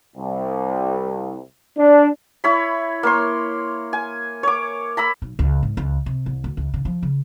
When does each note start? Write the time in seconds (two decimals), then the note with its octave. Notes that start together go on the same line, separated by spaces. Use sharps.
0.17 C2
1.78 D4
2.44 E4 C#5 B5
3.03 A#3 C#5 C6
3.93 G#5
4.43 C#5 D6
4.97 A#5 B5 E6
5.22 B1
5.39 C#2
5.63 G#2
5.77 C#2
6.06 C3
6.26 C2
6.44 D2
6.57 C#2
6.74 C#3
6.85 F3
7.03 C#3